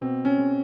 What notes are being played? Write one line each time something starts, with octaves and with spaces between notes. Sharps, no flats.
B2 C4
C#4
G#3